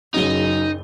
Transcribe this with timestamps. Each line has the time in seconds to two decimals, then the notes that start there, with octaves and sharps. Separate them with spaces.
0.14 F#1 C#3 F#3 D#4 G7